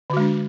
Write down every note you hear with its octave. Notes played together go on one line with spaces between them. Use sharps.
D3 G#3 D4 F#4